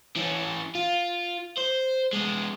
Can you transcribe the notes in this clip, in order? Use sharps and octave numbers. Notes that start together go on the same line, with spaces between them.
E3 C#4
F4
C5
G#3 B3